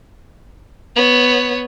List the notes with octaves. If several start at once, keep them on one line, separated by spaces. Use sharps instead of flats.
B3 C#5